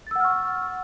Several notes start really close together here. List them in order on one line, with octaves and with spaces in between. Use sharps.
A6 E6 F#5 F6 C#6